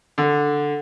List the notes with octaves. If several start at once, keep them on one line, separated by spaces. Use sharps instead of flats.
D3